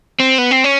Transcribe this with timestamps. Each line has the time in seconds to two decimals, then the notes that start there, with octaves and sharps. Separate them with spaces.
0.20 C4
0.38 B3
0.51 C4
0.64 C#4